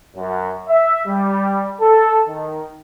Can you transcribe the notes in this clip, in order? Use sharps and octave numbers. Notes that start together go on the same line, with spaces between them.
F#2
E5
G3
A4
D#3